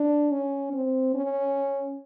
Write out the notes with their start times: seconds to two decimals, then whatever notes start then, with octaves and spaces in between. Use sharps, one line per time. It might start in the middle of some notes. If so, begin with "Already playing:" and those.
Already playing: D4
0.31 C#4
0.73 C4
1.14 C#4